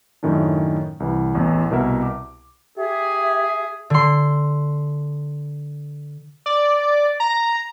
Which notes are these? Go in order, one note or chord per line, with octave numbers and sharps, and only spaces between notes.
F#2 A2 D#3 C#4 D4
C2 E3
A1 E2
C2 B2 A#4 E5
D6
G4 G#4 E5
D3 C6
D5
A#5